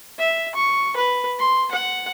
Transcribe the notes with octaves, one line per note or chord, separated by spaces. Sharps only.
E5
C#6
B4
C6
F#5